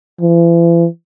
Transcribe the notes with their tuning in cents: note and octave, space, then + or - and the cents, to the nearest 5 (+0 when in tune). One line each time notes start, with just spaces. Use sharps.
E3 +40